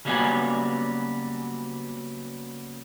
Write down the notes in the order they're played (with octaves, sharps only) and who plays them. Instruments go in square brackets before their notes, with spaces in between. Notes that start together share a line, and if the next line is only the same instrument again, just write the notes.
[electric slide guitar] C#3 F#3 G3 A#3 B3 G#5